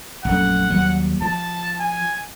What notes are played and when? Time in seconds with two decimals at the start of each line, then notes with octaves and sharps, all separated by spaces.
0.25 A#1 F#2 A3 F#5
0.70 D#2 F#3 G3
1.22 F3 A5
1.80 G#5